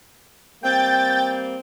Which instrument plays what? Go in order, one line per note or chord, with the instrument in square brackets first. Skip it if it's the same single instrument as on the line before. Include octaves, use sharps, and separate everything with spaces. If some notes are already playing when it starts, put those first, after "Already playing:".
[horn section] G3 A#3 C4 [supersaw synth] G5 G6 A6